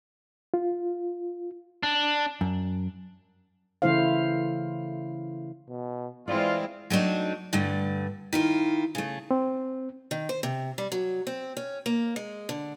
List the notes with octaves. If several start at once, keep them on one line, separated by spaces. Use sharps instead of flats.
F4
D4
F#2
C#3 E3 A3 E4 C5 F5
B2
E3 G#3 C4 E4 F4 D5
F#3 A3 C4 D4 D#4
G2 D3 A3
D#3 E4 F4
C#3 A3
C4
D#3
C5
C3
G3
F#3
C4
C#4
A#3
G#3
D3